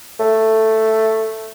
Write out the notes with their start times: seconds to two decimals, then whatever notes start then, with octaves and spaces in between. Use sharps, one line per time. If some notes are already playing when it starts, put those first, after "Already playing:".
0.20 A3